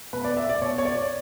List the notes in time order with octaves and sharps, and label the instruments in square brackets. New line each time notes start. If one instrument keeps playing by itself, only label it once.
[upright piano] B2 B4
D5
E5
D5
B2 C#5
C#5
D5